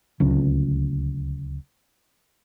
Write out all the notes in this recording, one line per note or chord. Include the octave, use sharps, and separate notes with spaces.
D1 C#2